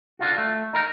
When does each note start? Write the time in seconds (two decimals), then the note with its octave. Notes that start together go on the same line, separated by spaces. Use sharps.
0.19 D3 F4 F#4
0.38 A3
0.73 D#4 A#4 E5 A#5